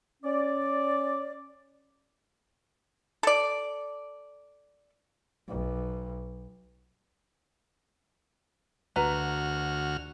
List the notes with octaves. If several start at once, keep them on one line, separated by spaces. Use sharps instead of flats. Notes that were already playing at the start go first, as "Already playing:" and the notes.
C#4 D5
A4 D5
B1
D2 F#4 B4 A#5 F6